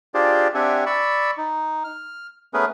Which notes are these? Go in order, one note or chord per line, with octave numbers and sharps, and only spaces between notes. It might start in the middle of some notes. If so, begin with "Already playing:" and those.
D4 F4 G4 G#4 C5 D5
C4 D4 G4 E5 F#5 G#5
D5 B5 C#6 E6
D#4
F6
A3 B3 C#4 G#4 A#4 B4